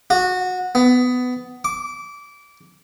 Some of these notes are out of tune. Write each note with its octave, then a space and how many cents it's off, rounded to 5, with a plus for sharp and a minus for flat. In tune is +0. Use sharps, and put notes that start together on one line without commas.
F#4 -15
B3 +15
D6 -20